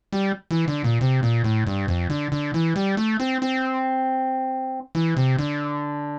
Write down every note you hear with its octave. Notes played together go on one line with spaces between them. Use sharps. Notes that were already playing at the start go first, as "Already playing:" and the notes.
G3
E3
D3
A#2
C3
A#2
A2
G2
F2
D3
D3
E3
G3
A3
C4
C4
E3
C3
D3